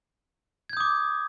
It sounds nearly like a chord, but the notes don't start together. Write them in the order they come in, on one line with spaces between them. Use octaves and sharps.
G#6 G6 D#6 D6